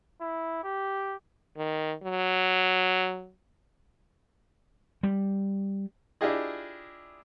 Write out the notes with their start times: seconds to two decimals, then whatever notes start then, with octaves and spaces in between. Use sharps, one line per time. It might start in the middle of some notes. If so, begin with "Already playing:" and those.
0.21 E4
0.63 G4
1.57 D#3
2.03 F#3
5.03 G3
6.21 D4 E4 F4 G4 G#4 D#5